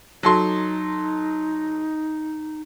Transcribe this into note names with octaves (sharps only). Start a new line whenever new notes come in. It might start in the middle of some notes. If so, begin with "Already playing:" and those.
F#3 D#4 A4 C6